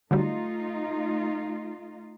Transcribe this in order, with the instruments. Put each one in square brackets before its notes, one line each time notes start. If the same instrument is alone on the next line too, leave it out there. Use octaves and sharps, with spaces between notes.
[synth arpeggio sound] D3 F#3 G3 [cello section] A3 D#4 F4